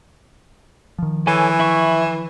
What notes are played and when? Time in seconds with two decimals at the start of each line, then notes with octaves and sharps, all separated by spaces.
0.98 D#3 F3
1.27 E3 A4 C#5 G#5
1.59 E4 E5 C#6